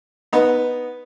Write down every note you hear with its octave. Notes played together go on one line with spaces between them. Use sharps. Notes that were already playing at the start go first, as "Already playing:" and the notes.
B3 D#4